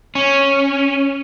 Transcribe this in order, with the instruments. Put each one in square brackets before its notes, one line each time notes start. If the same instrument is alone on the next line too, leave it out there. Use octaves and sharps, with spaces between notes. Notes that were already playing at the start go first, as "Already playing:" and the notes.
[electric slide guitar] C#4